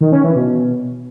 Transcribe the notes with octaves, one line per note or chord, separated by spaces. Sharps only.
D#3
C#4
E3
B2